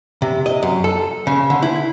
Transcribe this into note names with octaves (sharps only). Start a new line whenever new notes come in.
C3
D#5
F#2
A4
C#3
D3
E4